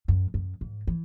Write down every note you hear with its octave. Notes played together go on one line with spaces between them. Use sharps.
F#2
F#2
G#2
E3